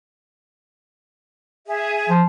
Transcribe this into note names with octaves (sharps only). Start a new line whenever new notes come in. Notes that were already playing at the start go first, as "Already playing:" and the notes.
G#4 E5
F3